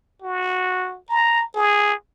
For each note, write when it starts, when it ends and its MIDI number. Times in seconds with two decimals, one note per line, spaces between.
0.22 0.98 66
1.09 1.46 82
1.54 1.93 68